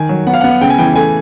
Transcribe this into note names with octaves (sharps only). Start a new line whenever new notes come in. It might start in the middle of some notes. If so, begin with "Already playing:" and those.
Already playing: D#3 G#5
F#3
B3 F#5
F5
B3 F#5
C#3 G5
G#5
E3 G5
A3 G#5